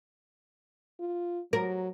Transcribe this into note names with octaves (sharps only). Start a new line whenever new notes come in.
F4
F#3 A#4